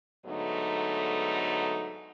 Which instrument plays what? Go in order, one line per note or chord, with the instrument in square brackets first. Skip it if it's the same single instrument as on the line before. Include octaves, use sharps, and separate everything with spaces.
[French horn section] G#2 D3 F#3 A3 B3 D#4